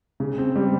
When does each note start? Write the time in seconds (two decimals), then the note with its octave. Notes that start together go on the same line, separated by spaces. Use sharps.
0.20 C#3
0.38 C4
0.56 G3